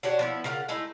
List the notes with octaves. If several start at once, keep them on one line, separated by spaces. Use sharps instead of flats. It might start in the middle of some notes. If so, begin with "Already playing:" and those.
D4 F#4 G4 C#5
F3 B3 E4
C#3 F4 A#4 F#5
G#3 A3 D#4 E4